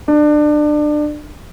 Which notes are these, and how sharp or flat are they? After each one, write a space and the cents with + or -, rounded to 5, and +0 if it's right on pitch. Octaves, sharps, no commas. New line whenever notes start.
D4 +25